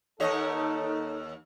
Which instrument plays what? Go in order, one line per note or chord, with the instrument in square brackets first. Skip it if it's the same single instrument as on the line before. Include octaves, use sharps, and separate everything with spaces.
[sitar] D#2 C#5 D#5 [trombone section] D#4 A4